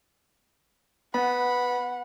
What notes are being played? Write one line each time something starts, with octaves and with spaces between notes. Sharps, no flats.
B3 F#5 B5